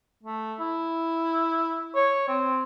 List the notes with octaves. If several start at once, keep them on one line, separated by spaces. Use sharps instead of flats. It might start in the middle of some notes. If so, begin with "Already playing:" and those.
A3
E4
C#5
C4